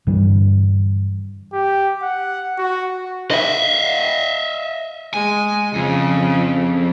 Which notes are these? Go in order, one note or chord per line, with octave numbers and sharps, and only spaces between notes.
G2 D3 E3 G3
G4
F#5
F#4
D#5 E5
G#3 G#5
F2 C#3